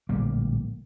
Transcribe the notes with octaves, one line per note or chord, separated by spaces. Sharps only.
D1 A#1 G3 A#3